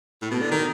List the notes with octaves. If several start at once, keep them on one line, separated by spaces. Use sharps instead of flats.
A2
B2
D3
D#3